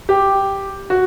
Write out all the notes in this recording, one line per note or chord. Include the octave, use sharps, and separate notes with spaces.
G4
F#4